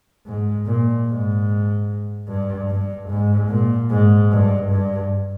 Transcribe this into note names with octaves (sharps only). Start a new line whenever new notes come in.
G#2
A#2
G#2
G2
G2
G#2
A#2
G#2
G2
G2